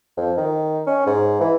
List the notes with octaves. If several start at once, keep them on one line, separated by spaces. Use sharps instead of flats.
F2
D#3
C#4
G#2
E3